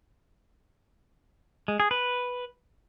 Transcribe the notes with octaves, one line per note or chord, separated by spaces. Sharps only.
G#3
G#4
B4